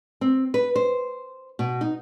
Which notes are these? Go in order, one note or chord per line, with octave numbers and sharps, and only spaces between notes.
C4
B4
C5
B2
D#4